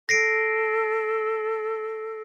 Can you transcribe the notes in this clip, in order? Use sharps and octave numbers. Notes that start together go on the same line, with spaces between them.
A4 A#6 C7 D7